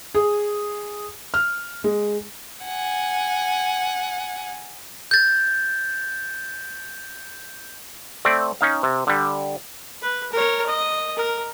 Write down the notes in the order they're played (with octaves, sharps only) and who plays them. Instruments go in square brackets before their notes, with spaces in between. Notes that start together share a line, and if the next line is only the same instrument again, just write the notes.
[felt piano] G#4
F6
G#3
[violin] F#5 G#5
[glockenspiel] G6 A6
[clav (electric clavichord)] A3 C4 D5
C#4 D#4 F5
C3
D3 G3
[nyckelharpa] B4
A#4 C#5
D#5
A#4